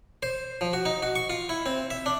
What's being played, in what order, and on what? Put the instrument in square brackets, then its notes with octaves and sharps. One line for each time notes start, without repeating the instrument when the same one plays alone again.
[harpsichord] C5
F3
F#4
D#4
F#4
C#6
F4
E4
C4
E5
D4